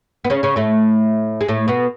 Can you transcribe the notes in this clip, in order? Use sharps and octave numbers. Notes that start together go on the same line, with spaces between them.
B3
C#3 C#4
C#3 C#4
A2 A3
G#3
A2 A3
B2 B3